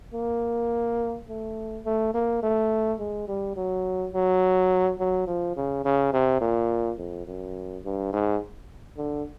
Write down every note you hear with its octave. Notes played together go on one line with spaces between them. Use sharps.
A#3
A3
A3
A#3
A3
G#3
G3
F#3
F#3
F#3
F3
C#3
C#3
C3
A#2
F2
F#2
G2
G#2
D3